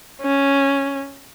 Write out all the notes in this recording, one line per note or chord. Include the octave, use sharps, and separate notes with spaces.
C#4